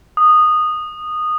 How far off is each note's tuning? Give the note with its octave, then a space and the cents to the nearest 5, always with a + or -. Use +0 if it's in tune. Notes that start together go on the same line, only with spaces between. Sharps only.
D#6 -15